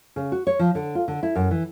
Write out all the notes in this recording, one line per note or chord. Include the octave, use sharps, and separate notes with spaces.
C#3
F#4
C#5
F3
D3
F4
D3
E4
F#2
E3